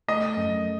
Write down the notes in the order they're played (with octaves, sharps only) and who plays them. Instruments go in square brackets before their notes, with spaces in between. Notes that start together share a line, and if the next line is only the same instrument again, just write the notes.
[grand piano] A3 [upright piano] D#5
[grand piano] F#2